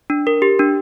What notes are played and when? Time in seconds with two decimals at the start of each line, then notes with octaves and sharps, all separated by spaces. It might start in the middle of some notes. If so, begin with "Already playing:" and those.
0.10 D4
0.27 A#4
0.42 G4
0.59 D4